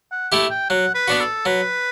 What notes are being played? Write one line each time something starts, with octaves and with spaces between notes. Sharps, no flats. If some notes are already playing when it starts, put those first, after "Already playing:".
F#5
A3 E4 G4
G5
F#3 F#5
B4
B3 D4 F#4
A4
F#3 B4